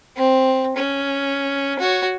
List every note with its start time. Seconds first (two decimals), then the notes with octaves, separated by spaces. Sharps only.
0.16 C4
0.76 C#4
1.79 F#4 C#5